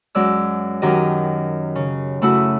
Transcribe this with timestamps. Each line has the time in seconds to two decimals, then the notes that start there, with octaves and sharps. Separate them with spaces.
0.15 F#2 G#3 D5 E6
0.82 F#2 D#3 G4 D#5
1.76 C#3
2.22 C#3 A3 E4 F#4 D#6 E6